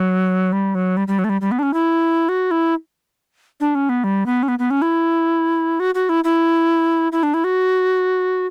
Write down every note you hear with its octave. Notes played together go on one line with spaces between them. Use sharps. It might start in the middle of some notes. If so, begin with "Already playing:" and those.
Already playing: F#3
G3
F#3
G3
G3
F#3
A3
G3
G3
B3
D4
C#4
E4
F#4
E4
D4
C#4
B3
G3
B3
C#4
B3
B3
C#4
E4
F#4
F#4
E4
E4
E4
D4
E4
F#4